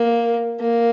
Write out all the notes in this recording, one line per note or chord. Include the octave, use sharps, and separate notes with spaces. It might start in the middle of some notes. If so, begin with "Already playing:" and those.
Already playing: A#3
A#3